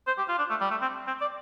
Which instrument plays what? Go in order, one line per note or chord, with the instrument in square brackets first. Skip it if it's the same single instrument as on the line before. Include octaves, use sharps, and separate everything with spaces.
[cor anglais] C5
G4
F4
D4
A3
G3
A3
C4
C4
D5